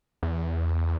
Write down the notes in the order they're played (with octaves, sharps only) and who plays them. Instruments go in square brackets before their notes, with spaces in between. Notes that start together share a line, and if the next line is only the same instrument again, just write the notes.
[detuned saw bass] E2